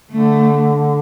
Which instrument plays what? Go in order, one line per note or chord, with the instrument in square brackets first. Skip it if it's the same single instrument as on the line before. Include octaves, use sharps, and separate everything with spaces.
[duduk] D3 [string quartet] A3